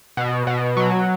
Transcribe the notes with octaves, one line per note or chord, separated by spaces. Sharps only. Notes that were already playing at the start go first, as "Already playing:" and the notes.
B2
B2
F#3